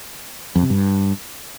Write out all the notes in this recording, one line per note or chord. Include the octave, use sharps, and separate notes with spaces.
F2
C3
G2